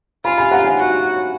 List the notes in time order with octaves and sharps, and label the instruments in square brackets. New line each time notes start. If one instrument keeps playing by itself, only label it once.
[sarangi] F4 [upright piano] G#5 B5
[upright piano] G#5 B5
F#5 A#5
F5 G#5
[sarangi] F#4